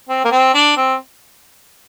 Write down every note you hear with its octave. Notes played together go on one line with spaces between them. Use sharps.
C4
A#3
C4
D4
C4